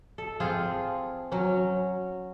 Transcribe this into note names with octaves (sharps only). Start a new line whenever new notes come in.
A4
F3 C4 F4 G#4
F#3 C#4